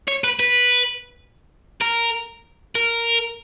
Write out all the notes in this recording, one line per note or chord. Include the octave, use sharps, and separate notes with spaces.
C#5
B4
B4
A#4
A#4